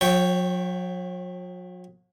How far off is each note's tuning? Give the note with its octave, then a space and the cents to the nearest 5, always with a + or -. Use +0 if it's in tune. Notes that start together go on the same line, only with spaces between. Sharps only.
F#3 -45 C#5 +0 G5 +0